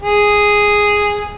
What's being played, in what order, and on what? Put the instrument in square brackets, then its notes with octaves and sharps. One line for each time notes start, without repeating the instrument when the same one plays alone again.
[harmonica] G#4